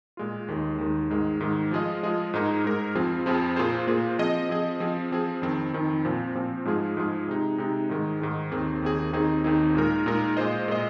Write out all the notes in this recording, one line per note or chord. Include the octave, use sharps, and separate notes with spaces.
A#2 G#3 F4
D#2 D#3 G#3
D#2 D#3 G#3
G#2 D#3 G#3
G#2 D#3 G#3
F3 G#3 F4 G#4 D#5
F3 G#3 F4 G#4 D#5
G#2 G#3 D#4 A#4
G#2 G#3 D#4 A#4
F2 F3 C4 F4 G#4
F2 F3 C4 F4 G#4
A#2 A#3 F4 G#4 C5
A#2 A#3 F4 G#4 C5
F3 C4 G#4 D#5
F3 C4 G#4 D#5
F3 C4 G#4
F3 C4 G#4
F2 D#3 C4
F2 D#3 C4
A#2 F3 C4
A#2 F3 C4
G#2 F3 G#3 F4 G#4
G#2 F3 G#3 F4 G#4
C3 G#3 D#4
C3 G#3 D#4
G#2 D#3 G#3
G#2 D#3 G#3
D#2 D#3 C4 G#4
D#2 D#3 C4 G#4
D#2 D#3 C4 D#4 G#4
D#2 D#3 C4 D#4 G#4
A#2 G#3 D#4 A#4
A#2 G#3 D#4 A#4
A#2 G#3 F4 C5 D#5
A#2 G#3 F4 C5 D#5